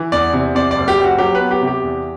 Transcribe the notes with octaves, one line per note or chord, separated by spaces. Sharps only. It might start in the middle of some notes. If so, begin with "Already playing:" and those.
Already playing: E3
E2 D5
C3
C4 D5
F#1 D5
G4
F#1
F#4
F#3 G4
B4
B3
G4
C3
G4
E2